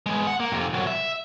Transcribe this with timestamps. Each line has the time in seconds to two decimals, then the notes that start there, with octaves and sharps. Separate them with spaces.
0.06 G#3 B3
0.27 F#5
0.40 A#3
0.52 F2 C3
0.73 C2 F#3
0.87 E5